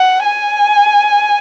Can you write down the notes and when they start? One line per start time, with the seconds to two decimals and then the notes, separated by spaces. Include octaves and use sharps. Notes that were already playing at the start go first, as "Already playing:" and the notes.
Already playing: F#5
0.25 G#5